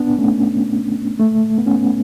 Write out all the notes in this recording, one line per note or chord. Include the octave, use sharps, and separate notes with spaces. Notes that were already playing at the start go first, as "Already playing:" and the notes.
Already playing: B3 D4
A3 C#4
A3
B3
C#4
B3